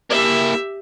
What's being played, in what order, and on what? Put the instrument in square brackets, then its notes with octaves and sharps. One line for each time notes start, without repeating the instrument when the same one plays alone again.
[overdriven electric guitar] A#3 E4 [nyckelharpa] G4 E5